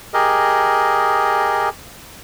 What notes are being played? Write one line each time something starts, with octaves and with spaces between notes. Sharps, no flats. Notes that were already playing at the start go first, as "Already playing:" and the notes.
G4 G#4 A#4 D#5